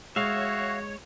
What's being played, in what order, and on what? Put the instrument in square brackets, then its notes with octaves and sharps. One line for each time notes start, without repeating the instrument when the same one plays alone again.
[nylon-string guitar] G#3 [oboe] F#4 [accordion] C#5 [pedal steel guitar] E5 F5